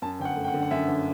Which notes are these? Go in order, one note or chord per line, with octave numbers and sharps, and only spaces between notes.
F#2 A5
G1 G5
F#5
A3
G5
F#5
D3
F#5
F#2 E5
G1